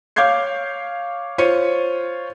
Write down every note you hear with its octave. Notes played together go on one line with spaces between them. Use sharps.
C#5 F5 D6 G6 G#6 C7
F4 C5 C#5 C#7 D#7